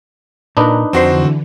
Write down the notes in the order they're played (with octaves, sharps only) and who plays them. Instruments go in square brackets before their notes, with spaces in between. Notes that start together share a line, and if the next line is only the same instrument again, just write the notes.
[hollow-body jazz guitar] A#2 A#4 [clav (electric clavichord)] D4 D#4 B4
[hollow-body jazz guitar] F2 C5 [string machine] D3 E3 [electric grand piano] C4 F#4